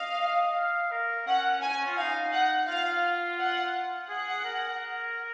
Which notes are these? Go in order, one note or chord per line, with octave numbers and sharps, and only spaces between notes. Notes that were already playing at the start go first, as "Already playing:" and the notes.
Already playing: D#5 F5
F5
A#4
C#4 F#5
G#5
F4
D#4 F5
F#5
F4 F5
F#5
G#4 F#5
A#4